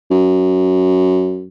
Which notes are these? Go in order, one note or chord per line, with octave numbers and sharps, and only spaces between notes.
F#2